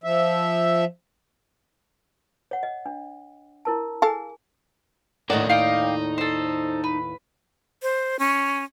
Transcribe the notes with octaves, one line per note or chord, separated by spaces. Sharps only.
F3 E5
C#5 F#5
D#5
D4
E4 A#4 A5
G#4 A4 F5 G#5 A5
D#2 A2 D4 E4 F#4 A#4 D5 D#5
D#4 F5 G5 D6
A4 C5
B4
C5
C#4